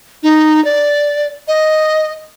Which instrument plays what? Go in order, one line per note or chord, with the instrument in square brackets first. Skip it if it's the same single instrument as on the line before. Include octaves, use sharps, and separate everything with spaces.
[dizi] D#4
D5
D#5